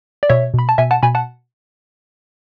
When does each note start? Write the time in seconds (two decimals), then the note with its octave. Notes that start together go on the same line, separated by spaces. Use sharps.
0.23 D5
0.29 B2 C#5 E5
0.54 B2 B5
0.69 A5
0.78 B2 E5 G#5
0.91 F#5 A5
1.03 B2 G#5 B5
1.15 F#5 A5